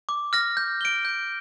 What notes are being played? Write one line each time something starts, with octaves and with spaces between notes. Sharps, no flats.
D6
F6 A#6
G6
D7 G7
G6